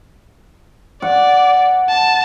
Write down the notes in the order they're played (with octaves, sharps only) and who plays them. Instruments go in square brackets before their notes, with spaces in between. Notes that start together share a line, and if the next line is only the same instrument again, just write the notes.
[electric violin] D5 [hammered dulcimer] F#5
[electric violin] A5